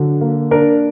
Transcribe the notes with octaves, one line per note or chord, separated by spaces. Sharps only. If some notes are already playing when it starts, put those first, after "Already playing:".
Already playing: D3 F#3
A#3
D4 A#4